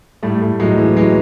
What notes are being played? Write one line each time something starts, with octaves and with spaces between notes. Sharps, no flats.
A2 G3 A3
A2
A2 F#3 G#3
E3
E3 F#3 G#3